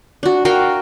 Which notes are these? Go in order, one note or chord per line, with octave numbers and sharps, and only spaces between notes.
D4 F#4
F#4 A#4 F5 G5